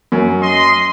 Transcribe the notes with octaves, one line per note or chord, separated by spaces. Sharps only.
F#2
D#5 C6